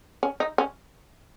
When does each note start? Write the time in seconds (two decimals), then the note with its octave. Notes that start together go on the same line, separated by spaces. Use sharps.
0.23 C#4
0.40 D#4
0.58 C#4